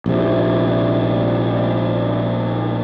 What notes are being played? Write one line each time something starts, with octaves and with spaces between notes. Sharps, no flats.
A#1 C3